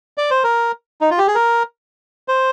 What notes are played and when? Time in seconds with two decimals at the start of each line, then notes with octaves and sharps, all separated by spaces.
0.18 D5
0.31 C5
0.44 A#4
1.01 D#4
1.11 F4
1.18 G4
1.27 G#4
1.35 A#4
2.28 C5